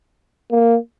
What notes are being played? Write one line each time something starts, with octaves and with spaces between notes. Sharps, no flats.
A#3